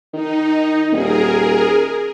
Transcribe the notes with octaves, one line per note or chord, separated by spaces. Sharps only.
D#3 D#4
D#1 G#4 A#4